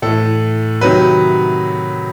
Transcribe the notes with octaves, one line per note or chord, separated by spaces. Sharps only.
A2 E3 A4
C3 D#3 F#3 B4